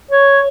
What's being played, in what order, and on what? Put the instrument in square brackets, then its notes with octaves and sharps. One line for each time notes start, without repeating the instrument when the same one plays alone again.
[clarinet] C#5